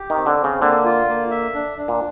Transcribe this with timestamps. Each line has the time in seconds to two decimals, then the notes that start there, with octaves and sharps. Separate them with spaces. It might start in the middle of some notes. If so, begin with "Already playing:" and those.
Already playing: G4
0.10 D#3 C4
0.26 D3
0.39 C4
0.44 C#3
0.62 D3 A#3
0.85 F4
1.08 A#3
1.31 E5
1.54 D4
1.78 D4
1.88 A#2